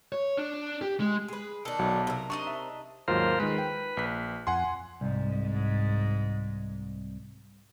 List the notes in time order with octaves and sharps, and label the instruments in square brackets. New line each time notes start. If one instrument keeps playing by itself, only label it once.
[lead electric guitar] C#5
D4
G4
G#3
[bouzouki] G#4 B4
[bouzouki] D#3 D4 [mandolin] A4
[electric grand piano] B1 F#3
[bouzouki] C3 A#4
[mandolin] D4 D#4 D#5 [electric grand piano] C#6
[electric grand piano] E5
[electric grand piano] D#2 G#2 F#3 [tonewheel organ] F4 A#4 C5
[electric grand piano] D#3 G#3 [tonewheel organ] B4
[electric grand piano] G5
A#1 B6
[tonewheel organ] F2 [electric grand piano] F#5 G#5 C6
[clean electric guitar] C2 [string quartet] G#2